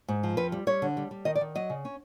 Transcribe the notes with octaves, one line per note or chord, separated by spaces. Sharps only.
G#2
F3
F2 B4
G3
G3 C#5
D3
G3
G3
D#3 D#5
D5
D#3
F#3 D#5
C#3
C#4